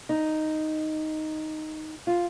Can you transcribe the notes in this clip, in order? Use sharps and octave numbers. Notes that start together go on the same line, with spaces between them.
D#4
F4